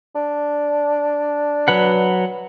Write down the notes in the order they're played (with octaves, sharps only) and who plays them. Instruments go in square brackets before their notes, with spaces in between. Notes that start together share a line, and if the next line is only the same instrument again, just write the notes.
[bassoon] D4
[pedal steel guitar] F#3 B4 F#5